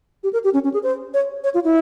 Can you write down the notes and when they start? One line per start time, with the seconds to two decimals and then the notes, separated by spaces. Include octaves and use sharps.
0.23 G4
0.33 A#4
0.44 G4
0.54 C#4
0.64 C#4
0.74 G#4
0.83 C5
1.14 C#5
1.44 C#5
1.54 F4
1.64 E4